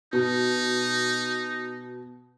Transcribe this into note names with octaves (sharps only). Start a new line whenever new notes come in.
B2 D#4